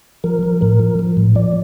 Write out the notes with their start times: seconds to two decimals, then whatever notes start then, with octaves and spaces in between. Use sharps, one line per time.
0.24 F3 A#4
0.43 F3
0.61 A2 A#4
0.79 F3
0.99 F3
1.17 A2
1.35 F3 D5